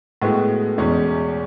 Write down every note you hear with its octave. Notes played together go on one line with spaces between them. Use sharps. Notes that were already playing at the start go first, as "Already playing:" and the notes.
A2 G#3 B3 F#4
E2 B2 G#3 C#4